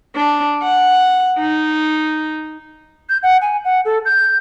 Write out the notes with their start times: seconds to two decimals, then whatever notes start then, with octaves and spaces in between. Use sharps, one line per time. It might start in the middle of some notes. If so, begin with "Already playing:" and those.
0.16 D4
0.63 F#5
1.39 D#4
3.09 G6
3.23 F#5
3.41 G#5
3.64 F#5
3.85 A4
4.05 G6